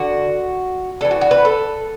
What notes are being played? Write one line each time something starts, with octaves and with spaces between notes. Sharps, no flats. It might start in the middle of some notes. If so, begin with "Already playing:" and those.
Already playing: D3 F#4
E3 D4 A4
F#4
F#4
B4
A4